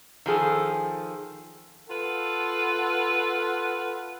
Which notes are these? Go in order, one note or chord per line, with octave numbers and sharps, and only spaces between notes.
D#3 F3 G#4 A4
F4 A4 B4 F#5